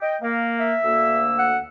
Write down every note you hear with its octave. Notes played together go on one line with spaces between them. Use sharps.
D#5 G5
A#3
E5
D2 A#3 E6
F#5